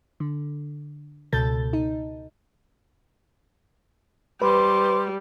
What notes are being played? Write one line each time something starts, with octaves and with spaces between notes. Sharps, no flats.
D3
C#2 B2 A4 G6 A6
D#4
G3 B4 C5 C6 D6